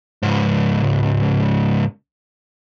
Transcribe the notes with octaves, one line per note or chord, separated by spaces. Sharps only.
C#2 G#2